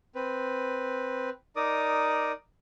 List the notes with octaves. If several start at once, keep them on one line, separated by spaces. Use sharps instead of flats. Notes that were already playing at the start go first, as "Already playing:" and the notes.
C4 B4
D#4 A#4 D5 D6 D#6